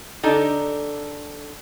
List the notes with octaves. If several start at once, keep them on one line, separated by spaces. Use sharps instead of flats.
D3 D4 D#4 G4 A4 D#5